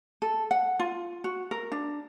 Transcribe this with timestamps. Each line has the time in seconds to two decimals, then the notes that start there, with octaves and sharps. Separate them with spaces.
0.22 A4
0.51 F#5
0.79 F4
1.24 F#4
1.51 A#4
1.72 D4